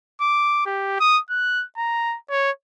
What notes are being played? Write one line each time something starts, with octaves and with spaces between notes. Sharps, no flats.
D6
G4
D#6
F#6
A#5
C#5